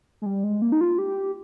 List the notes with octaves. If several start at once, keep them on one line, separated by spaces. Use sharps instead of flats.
G#3
G3
G#3
A#3
D#4
F4
G4